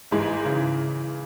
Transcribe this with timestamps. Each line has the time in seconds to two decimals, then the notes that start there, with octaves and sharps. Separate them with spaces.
0.11 G#1 G#2 E3 G#3
0.45 C#3 E3